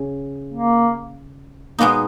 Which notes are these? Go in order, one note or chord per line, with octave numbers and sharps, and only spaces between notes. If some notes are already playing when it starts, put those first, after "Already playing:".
Already playing: C#3
A#3
B2 G#3 A#3 B3 D#4